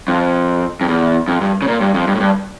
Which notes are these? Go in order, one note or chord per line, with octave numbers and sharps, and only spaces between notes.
F2
F2
E2
F2
G2
C#3
A#2
G2
F2
G2
A2
G2